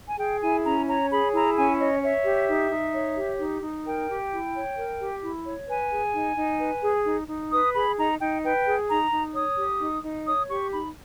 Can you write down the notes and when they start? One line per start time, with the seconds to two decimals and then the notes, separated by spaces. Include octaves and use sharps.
0.07 G#5
0.19 G#4 G5
0.41 E4 G#5
0.64 C#4 A#5
0.87 C#5 A#5
1.10 G#4 B5
1.33 E4 A#5
1.56 C#4 G#5
1.79 C#5 D#5
2.02 C#5 E5
2.25 G4
2.48 D#4
2.71 D#4
2.93 C#5
3.16 G4
3.39 D#4
3.62 D#4
3.85 A#4 G5
4.08 G4
4.31 E4
4.54 C#5
4.77 A#4
5.00 G4
5.22 E4
5.45 C#5
5.68 B4 G#5
5.91 G#4
6.14 D#4
6.37 D#4
6.59 B4
6.82 G#4
7.05 D#4
7.28 D#4
7.51 B4 D#6
7.74 G#4 B5
7.97 D#4 A#5
8.20 D#4 G5
8.43 B4 G5
8.66 G#4
8.89 D#4 A#5
9.11 D#4
9.34 C#5 D#6
9.58 G4
9.80 D#4
10.04 D#4
10.26 C#5 D#6
10.49 G4 C#6
10.72 D#4 B5